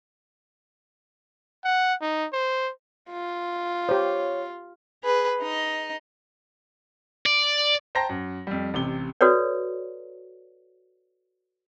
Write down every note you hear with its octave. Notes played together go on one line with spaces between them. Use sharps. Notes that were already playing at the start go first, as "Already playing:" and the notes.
F#5
D#4
C5
F4
G4 C5 C#5
G#4 B4
D#4 D#5
D5
C5 G5 A5 A#5 A#6
F#2
F2 G3
A1 C3 G7
F#4 A4 B4 C#5 D5